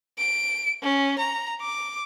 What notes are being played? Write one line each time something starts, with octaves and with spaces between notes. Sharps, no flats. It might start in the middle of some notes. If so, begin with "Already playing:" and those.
D7
C#4
A#5
D6